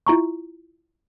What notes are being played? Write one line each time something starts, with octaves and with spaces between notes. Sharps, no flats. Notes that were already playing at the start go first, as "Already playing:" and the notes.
E4 F4 A#5 C#6